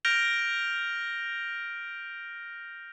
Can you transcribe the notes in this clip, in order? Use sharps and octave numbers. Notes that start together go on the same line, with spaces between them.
F6 G6 A#6 D7 F7 G7